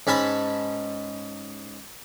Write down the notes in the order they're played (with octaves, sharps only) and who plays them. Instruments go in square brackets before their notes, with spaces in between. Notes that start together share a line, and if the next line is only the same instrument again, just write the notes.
[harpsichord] G#2 C#4 G#5 A5 B5